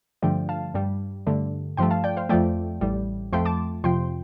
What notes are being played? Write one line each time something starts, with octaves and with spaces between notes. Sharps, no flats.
G2 D3 F3 A3 D5 G5
F5 A5
G2 G3
G2 D3 A3
G2 F3 A3 G5 C6
F5 A5
D5 G5
C5 F5
F2 F3 A3 D5 G5
A1 A2 G3
F2 F3 A3 G5 C6
A5 D6
F2 C3 F3 G5 C6